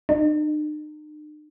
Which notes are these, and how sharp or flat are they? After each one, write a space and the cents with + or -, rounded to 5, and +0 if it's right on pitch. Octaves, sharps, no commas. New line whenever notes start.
D#4 -45